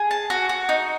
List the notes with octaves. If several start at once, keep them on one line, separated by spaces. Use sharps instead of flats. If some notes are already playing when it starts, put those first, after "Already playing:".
Already playing: G#4
A5
F#4
F#4
D#4